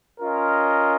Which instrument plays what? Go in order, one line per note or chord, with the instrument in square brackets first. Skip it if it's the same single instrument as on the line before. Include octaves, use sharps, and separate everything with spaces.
[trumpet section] C#4 F4 A#4 D#5